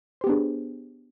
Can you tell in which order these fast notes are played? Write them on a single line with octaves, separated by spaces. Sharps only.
C5 G4 B3 D4 G#4